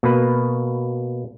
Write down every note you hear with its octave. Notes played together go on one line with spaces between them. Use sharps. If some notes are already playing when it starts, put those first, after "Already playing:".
B2 A#3 B4